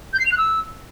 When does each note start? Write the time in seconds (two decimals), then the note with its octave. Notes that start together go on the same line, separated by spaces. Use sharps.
0.13 G6
0.19 C7
0.25 F7
0.31 F#6
0.38 E6